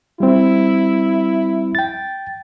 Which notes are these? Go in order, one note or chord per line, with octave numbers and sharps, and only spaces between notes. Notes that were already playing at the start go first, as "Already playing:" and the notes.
G3 C4 E4
G5 A6